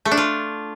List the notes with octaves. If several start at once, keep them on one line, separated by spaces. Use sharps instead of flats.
A3
D4
F4